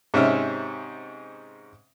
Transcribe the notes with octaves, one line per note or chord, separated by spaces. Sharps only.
G#2 C3 C#4 E5 F6